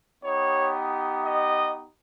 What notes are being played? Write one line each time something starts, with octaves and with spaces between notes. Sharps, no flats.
B3 D#4 G4 C#5
D#5